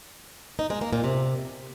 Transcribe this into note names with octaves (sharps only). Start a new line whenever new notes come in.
D#4
G#3
A#3
A#2
C3